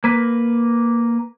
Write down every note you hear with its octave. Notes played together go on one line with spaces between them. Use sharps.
A#3 B4